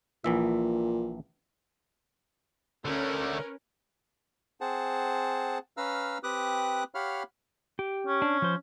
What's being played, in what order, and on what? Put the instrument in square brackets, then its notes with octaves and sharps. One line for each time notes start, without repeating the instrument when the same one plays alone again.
[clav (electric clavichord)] A#1 E3 E5 [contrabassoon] A#2
[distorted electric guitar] D3 A3 [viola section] C#4 A#4 B4
[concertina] C4 G#4 C5 F#5 A5
C#4 B4 F5 A#5 E6 F6
C4 G4 B4 D6 D#6 F#6
G4 C#5 F5 F#5 B5 F6
[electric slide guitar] G4
[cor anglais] C#4
[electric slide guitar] D4
F3 C5